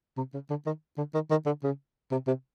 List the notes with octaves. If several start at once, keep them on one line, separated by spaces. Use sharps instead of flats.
C3
C#3
D3
D#3
D3
D#3
D#3
D3
C#3
C3
C3